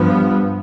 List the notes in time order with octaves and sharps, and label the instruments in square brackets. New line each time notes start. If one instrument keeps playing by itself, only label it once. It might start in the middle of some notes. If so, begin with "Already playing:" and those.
Already playing: [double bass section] G2 F3 B3